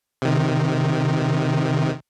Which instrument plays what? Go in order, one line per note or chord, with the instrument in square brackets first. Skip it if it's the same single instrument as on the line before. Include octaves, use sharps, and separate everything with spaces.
[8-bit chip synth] C3 D#3